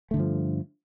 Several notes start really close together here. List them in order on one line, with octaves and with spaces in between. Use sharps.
A3 D3 G2 F3